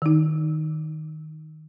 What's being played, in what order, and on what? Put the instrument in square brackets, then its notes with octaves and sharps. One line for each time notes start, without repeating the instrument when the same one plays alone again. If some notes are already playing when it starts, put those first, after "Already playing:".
[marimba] D#3 D#4